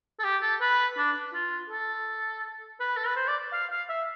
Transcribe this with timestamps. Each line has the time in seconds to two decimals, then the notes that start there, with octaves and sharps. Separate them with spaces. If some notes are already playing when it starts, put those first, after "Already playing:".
0.19 A4
0.24 G4
0.42 A4
0.61 B4
0.97 D4
1.34 F4
1.70 A4
2.80 B4
2.97 A4
3.07 B4
3.16 C5
3.28 D5
3.53 F5
3.71 F5
3.89 E5